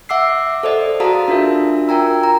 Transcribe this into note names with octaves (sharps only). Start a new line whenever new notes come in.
E5 F#5 D6 E6 C7
A4 C5 D5 D#5
F#4 G#4 F5 A5 A#5 D#6
D4 F4 F#4 A#4 E5
F4 A#4 G5 G#5 A#5 E6
A#5